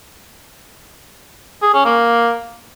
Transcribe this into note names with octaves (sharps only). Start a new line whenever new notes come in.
G#4
C#4
A#3